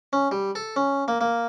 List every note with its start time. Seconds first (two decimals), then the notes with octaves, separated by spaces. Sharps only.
0.13 C#4
0.32 G3
0.55 A4
0.76 C#4
1.08 A#3
1.21 A#3